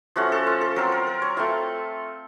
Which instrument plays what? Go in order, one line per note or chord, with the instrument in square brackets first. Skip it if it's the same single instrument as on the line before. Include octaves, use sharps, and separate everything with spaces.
[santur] F3 A3 C#4 F#4
A4
F4
A4
F#3 C4 F4 A#4
A#4
A#4
C#5
A3 C4 F4 F5